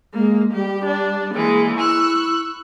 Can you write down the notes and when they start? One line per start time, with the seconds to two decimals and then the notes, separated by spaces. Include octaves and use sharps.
0.14 G#3 A#3
0.54 G3 G4
0.86 D4
1.35 E3 G#3 A#3 G#4
1.77 E4 C#6 E6 F#6